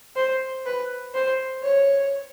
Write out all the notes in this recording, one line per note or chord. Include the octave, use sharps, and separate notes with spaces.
C5
B4
C5
C#5